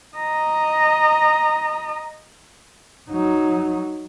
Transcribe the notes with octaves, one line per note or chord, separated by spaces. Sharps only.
D#5 A#5
F#3 D#4